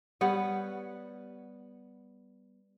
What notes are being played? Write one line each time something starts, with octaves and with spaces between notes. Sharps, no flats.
G3 B3 C#5 F#5